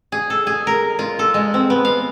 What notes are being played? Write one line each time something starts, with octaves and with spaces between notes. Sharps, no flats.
G#4
A4
G#4
A#4
F4
A4
G#3
C4
B3
F5